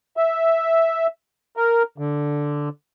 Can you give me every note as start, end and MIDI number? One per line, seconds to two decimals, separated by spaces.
0.17 1.07 76
1.57 1.83 70
1.98 2.69 50